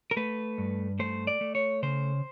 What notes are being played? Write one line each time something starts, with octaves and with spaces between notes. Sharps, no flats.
A#4
A3 B4
G2
A3 C5
D5
A3
C#5
C#3 C5